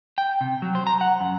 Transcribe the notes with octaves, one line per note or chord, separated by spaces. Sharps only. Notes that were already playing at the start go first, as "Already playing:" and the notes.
G5
C3
F#3
C5
A#5
F#5
F#2